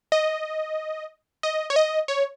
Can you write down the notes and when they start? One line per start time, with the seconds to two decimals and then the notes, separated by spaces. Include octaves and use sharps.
0.12 D#5
1.43 D#5
1.70 C#5
1.76 D#5
2.08 C#5